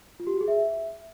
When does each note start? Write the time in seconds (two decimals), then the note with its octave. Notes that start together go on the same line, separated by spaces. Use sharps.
0.20 F4
0.27 G4
0.34 F#4
0.41 G#4
0.48 E5